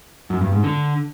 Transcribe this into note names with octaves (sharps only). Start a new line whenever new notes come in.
F#2
G2
G#2
D3